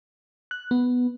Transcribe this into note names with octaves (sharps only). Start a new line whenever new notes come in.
F#6
B3